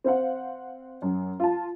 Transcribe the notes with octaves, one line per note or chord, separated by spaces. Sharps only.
C4 C5 F5 F#5
F#2
F4 A5